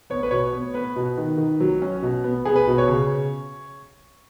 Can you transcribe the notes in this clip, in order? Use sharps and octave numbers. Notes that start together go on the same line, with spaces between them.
B3 C#5
B4
B2 C#5
B3
B3 B4
B2
D#3
D#3
F#3
C#4
B2
B3
B3 G#4
B4
B2
C#5
C#3